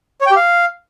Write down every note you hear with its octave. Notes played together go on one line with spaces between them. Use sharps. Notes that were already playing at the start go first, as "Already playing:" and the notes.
C#5
G5
G4
F5